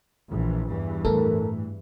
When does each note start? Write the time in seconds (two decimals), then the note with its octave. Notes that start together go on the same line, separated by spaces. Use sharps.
0.29 A#1 E3
0.68 E2 G2 E3
1.05 A2 A4 A#4